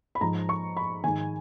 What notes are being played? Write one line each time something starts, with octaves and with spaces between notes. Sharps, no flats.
B5
G#2 F3 A#5
C#6
B5
G#2 D#3 G#5